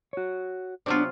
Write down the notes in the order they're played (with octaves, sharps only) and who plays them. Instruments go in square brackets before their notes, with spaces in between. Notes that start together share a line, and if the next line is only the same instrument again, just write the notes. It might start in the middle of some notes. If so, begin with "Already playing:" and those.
[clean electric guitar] F#4 C#5
[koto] C3 F#3 F4 [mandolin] B3 D5 [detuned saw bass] D4